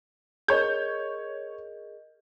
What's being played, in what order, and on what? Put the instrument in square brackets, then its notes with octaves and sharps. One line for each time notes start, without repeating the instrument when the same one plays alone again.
[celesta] G#4 A#4 D#5 [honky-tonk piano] C#5 G6